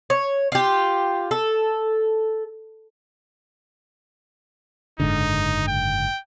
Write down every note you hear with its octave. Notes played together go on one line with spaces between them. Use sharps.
C#5
F4 G4
A4
F#1 G#2 D3 D#4
G5